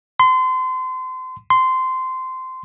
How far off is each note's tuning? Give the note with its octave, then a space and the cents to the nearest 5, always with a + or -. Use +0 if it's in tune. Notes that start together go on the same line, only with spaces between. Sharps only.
C6 -30
C6 -15